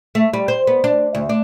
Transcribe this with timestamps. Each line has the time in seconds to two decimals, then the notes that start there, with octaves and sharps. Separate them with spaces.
0.15 A3
0.33 G3
0.48 C5
0.67 B3
0.84 D4
1.15 D2
1.29 D4